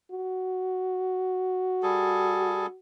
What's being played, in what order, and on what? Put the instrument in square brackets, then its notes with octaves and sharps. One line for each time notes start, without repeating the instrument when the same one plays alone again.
[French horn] F#4
[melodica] G3 G#4 A4